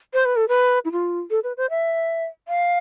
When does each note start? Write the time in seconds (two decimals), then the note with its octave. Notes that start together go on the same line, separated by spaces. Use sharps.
0.14 C5
0.25 B4
0.36 A4
0.48 B4
0.85 E4
0.92 F4
1.31 A4
1.44 B4
1.57 C5
1.70 E5
2.48 F5